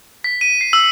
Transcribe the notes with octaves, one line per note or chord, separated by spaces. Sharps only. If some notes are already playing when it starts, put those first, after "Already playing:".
B6
D#7
C7
E6